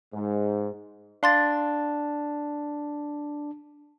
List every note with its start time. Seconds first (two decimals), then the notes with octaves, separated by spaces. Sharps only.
0.14 G#2
1.23 D4 F5 C6 A6